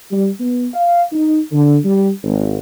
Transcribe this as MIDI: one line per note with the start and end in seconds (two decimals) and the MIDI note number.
0.11 0.29 55
0.39 0.67 59
0.74 1.03 77
1.12 1.39 63
1.51 1.77 50
1.84 2.10 55
2.23 2.59 32